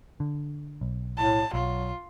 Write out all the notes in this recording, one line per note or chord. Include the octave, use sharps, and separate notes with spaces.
D3
B1
A2 A5
B1 F#3 F4